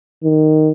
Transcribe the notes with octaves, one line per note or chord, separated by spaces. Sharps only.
D#3